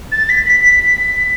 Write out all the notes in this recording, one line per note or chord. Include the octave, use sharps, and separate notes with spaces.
A6
B6
B6
B6